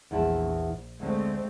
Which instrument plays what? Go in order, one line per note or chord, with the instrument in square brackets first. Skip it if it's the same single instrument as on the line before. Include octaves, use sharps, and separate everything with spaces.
[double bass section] A#1 [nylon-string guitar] E2 E4 A5
[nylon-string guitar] D2 [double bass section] G#3 A3 C4